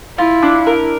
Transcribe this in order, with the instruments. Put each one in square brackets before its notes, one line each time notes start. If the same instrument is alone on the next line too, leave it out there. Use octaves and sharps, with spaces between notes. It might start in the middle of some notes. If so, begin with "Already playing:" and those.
[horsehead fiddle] E4 [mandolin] F4
[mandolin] D4
A#4